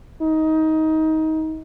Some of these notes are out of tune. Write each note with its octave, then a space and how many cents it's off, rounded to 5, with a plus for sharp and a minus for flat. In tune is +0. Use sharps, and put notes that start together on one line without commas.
D#4 +20